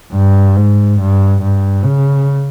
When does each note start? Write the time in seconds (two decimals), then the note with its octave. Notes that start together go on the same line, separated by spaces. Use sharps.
0.13 G2
0.56 G#2
1.00 G2
1.42 G2
1.84 C#3